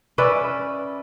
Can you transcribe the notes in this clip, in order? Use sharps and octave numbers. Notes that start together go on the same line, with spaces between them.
C#4 B4 D5 E5